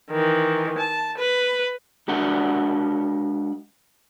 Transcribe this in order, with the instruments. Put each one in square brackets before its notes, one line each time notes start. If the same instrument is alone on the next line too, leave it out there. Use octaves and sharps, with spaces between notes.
[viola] D#3 E3
A5
B4
[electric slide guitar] G#3 D4 F#4 A#4 D5 F#5